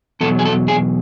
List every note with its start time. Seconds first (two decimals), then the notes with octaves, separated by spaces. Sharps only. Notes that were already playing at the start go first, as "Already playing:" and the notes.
0.21 E2 B2 F#3 A4
0.39 G#4
0.45 A4
0.68 G#4